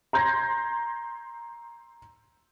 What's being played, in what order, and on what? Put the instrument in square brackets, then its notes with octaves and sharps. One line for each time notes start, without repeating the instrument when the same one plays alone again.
[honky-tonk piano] A#5 C6 G6 G#6 A#6